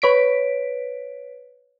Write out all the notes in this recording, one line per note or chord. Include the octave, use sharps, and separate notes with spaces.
B4 C#5 B6 D7